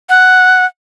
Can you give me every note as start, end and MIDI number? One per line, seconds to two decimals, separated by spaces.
0.09 0.65 78